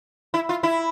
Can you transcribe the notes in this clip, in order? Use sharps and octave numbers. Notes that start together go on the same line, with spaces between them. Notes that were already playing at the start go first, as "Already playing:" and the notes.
E4
F4
E4